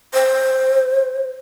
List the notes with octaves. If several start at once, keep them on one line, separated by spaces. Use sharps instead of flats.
C5